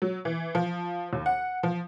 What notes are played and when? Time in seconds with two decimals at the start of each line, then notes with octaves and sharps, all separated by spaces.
0.02 F#3
0.25 E3
0.55 F3
1.13 D#2
1.26 F#5
1.63 F3